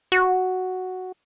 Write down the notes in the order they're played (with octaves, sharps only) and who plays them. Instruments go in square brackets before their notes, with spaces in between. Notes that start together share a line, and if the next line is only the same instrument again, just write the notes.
[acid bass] F#4